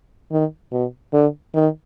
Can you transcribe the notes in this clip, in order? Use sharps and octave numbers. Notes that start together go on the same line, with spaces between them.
D#3
B2
D3
D#3